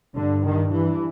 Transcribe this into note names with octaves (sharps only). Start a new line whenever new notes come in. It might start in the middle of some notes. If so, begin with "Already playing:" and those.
G2 D3
D#3
E3